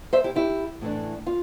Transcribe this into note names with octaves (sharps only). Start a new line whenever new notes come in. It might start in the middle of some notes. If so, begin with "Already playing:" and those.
C5 E5
E4 G4
E4 G4
A2 E3 A3 D4
F4